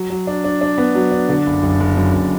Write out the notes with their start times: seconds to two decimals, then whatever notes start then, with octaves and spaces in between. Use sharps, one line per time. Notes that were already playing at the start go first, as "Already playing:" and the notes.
Already playing: F#3
0.10 F#3
0.27 D4
0.44 D4
0.61 D4
0.78 B3
0.95 F#3
1.11 D4
1.29 D3
1.46 F#1
1.63 F#1
1.80 F#1
1.97 F#2
2.13 F#1